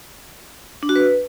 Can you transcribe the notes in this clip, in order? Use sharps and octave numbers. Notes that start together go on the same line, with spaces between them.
D4
F#4
B4